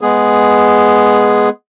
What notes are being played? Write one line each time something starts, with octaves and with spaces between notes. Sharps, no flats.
G#3 B3 G#4